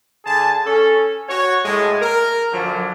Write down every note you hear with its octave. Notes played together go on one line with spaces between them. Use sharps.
D3 G#4 A5
C#4 A4
F#4 C#5
A2 G#3
A#4
F#2 D3 F3 F#3